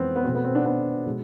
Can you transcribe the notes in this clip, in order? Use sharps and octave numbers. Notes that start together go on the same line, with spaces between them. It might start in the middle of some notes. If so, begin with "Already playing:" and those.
Already playing: F2 E3 G#3 B3 C4
B3
B2 A3 C4
B3
C4
B3 D4
B3 D4
B2 G#3